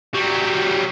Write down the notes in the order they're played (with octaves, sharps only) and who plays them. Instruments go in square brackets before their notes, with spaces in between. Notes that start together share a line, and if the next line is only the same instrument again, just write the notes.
[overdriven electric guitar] F#3 G3